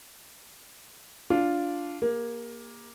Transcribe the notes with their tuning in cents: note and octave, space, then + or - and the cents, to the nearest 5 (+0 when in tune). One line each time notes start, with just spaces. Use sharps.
D4 -10 F4 +0
A#3 +15 G#4 -45